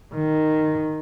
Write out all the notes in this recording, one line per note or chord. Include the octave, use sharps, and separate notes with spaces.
D#3